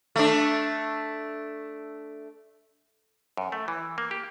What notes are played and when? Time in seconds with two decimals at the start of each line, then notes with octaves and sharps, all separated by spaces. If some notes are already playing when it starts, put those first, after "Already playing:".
0.16 A3 D4
3.37 F#2
3.52 A3
3.68 E3
3.98 A#3
4.11 G4